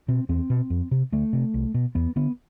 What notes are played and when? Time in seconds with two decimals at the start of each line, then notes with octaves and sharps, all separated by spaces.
0.08 B2 C4
0.29 E2 C4
0.50 B2
0.70 F2
0.91 C3
1.12 D2 A3
1.33 C3
1.54 C2
1.74 B2
1.95 E2 B3
2.16 D3 B3